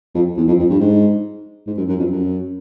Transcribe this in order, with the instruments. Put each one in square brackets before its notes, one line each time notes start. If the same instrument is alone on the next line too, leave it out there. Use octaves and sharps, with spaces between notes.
[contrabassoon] F2
E2
F2
F2
G2
G#2
G#2
F#2
F#2
F2
F#2